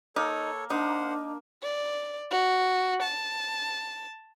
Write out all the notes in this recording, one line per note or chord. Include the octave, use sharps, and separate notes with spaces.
A#3 D#4 A4 C#5
A#3 D4 D#4 C5 F#5
D5
F#4
A5